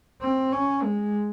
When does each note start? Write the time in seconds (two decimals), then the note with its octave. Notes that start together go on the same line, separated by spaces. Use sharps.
0.21 C4
0.52 C#4
0.83 G#3